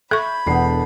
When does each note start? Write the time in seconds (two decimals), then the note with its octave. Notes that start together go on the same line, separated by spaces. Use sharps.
0.11 A4 E5 B5 C#6 G6 G#6
0.46 E1 E2 D3 B3 C7